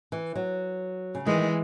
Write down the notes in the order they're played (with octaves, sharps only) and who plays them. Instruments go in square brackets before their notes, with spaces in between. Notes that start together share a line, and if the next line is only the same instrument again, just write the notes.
[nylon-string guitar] E3
F#3
C#3
[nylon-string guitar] D#3 [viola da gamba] E3 G#3